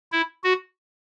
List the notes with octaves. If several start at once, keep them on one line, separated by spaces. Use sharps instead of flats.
E4
F#4